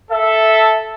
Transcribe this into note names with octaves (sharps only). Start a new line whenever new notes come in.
A4 E5